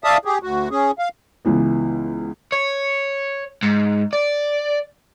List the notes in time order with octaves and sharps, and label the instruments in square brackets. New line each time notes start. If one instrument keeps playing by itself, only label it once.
[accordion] D5 E5 F5 A5 D#6
G4 G#4
D2 F#4
C#4 G#4
F5
[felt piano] C#2 E3 B3
[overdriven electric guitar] C#5
G#2
D5